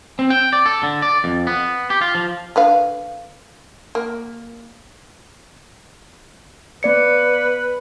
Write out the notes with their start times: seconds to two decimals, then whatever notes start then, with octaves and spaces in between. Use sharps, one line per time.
0.19 C4
0.30 G5
0.53 D5
0.66 A4
0.83 D3
1.02 D5
1.24 F2
1.47 B3
1.90 G4
2.01 F4
2.15 F3
2.56 D3 B4 F5
3.95 A#3
6.83 B3 B4 D5 C#7